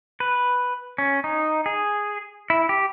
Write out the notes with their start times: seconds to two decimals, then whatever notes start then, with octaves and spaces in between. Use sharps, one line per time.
0.20 B4
0.98 C#4
1.24 D#4
1.66 G#4
2.50 E4
2.69 G4